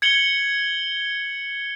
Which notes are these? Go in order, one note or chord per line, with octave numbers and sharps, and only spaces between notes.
G#6 C#7 F#7 G7